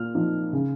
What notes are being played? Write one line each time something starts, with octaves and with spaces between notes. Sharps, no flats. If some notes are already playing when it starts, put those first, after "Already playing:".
Already playing: A#2 F6
F3 C4 D#4
C#3